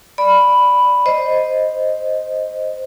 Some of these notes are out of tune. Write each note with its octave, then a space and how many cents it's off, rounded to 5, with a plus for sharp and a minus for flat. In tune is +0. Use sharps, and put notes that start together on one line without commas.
D5 +0 B5 +0
C5 +0 D#5 +0